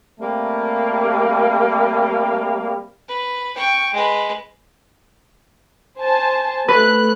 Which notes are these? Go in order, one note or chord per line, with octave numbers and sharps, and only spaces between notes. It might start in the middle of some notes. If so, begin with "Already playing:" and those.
C3 G3 A3 A#3
B4
G5 C#6
G#3 B4
C5 G#5 A5
A3 B4 F#6